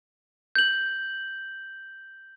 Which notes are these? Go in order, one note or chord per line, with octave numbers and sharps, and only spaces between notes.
G6 F#7